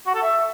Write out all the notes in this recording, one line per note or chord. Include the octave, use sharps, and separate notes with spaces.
F#4
A4
E5